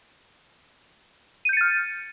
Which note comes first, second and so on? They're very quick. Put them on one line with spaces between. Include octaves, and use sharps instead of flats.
D#7 G6 C#7 A6 F6